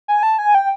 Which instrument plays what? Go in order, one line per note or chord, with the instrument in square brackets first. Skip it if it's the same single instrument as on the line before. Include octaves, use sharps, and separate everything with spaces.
[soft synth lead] G#5
A5
G#5
G5